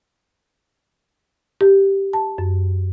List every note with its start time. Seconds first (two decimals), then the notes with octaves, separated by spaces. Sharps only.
1.61 G4
2.13 A5
2.38 F#2